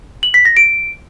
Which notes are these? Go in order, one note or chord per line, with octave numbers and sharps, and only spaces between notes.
F#7
B6
A#6
D7